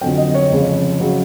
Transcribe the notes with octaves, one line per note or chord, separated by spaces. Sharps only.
F2 D3 F#3 G5
D#5
C#5
F2 C#3 F3 G#3
C#3 F#3